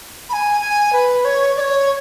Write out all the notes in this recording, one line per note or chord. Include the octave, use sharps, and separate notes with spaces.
B5
G#5
G#5
B4
C#5
D5
C#5